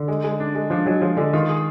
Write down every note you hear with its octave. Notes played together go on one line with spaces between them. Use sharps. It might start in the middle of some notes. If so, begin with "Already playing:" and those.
Already playing: D3
G#3
G#3
D4
G#3
F3 D4
F#3 G#3
F3 G#3
D3 G#3
D#3 F4
G#4